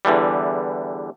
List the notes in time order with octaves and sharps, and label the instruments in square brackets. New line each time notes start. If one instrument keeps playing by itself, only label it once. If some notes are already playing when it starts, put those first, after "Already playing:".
[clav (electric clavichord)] E2 D3 E3 G3